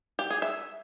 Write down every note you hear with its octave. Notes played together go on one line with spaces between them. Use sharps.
G4
G#4
E5